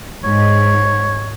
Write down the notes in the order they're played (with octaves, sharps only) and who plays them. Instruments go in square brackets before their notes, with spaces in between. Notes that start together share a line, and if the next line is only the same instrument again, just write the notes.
[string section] G#2 [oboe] C#5